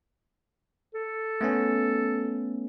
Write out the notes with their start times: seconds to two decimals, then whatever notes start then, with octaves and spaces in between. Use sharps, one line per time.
0.95 A4
1.41 A3 B3 C#4